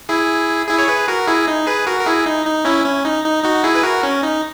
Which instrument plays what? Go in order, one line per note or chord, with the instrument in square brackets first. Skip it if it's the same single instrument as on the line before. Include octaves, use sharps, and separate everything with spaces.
[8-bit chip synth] E4 G#4
E4 G#4
C#5
G#4 B4
F#4 A#4
E4 G#4
D#4
G#4 B4
F#4 A#4
A#4
E4 G#4
D#4
D#4
C#4 E4
C#4
D#4
D#4
D#4 F#4
E4 G#4
B4
F#4 A#4
C#4
D#4